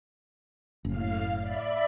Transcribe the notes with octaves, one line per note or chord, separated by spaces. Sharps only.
F#1 A2 F5
D5 E5 B5